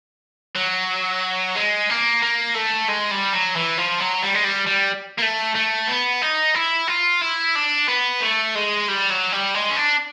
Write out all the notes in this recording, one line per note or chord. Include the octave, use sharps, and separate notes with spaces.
F#3
G#3
A#3
A#3
A3
G#3
G3
F#3
E3
F3
F#3
G3
G#3
G3
G3
A#3
A3
A3
B3
D#4
E4
F4
E4
D4
B3
A3
G#3
G3
F#3
G3
G#3
C#4
D4